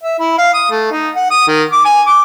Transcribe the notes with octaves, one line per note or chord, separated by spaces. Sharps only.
E5
E4
F5
D#6
A3
D#4
F#5
D#6
D#3
D6
G#5
D6